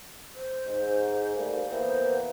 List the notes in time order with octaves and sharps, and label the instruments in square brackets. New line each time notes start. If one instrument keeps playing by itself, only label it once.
[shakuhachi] C5
[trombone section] G#2
G3 A3 A#3
[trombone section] E3 A#3 B3 [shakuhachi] C5